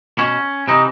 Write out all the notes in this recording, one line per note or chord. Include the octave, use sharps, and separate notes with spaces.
B2 C#4
C3 E3 D#4